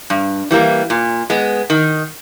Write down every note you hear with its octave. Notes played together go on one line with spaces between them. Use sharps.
G2
E3 G3 A#3
A#2
G#3 B3
D#3